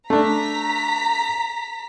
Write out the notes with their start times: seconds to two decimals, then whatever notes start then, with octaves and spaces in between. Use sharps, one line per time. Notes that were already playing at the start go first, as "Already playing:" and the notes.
0.10 A3 D4 A#5 B6